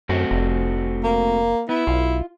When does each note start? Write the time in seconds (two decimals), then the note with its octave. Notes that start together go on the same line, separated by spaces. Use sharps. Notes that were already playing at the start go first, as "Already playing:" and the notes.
0.09 F#2 A3 C4 F#4
0.31 F1
1.04 A#3
1.69 B3 E4
1.87 B1 F4